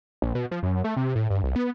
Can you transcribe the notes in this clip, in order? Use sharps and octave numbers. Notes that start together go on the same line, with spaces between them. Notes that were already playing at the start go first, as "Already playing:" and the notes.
A#1
B2
F3
F#2
A3
C3
A2
G2
C2
B3